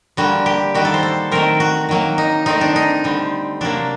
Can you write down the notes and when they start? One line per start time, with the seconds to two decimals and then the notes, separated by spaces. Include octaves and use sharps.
0.17 D3 G3 A#3 F#4
0.46 G4
0.74 D#3 G3 A#3 F#4
0.85 A4
0.94 C5
1.03 A4
1.31 D#3 F#3 A3 C4 A#4
1.60 F#4
1.89 D#3 F#3 A#3
2.18 D#4
2.46 D#3 A3 C4 D#4
2.61 D4
2.76 D#4
3.04 D3 G3 C4
3.61 C3 F#3 A#3 D4